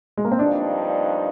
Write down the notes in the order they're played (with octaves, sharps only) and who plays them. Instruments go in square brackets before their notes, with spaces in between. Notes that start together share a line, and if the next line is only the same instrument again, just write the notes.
[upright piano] G#3
A#3
C4
[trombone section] G2 F3 A#3 D#4 [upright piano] D4